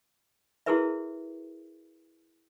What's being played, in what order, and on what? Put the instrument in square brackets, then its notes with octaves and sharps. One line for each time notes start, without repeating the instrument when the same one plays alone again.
[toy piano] E4 F#4 G#4 A#4 B4 E5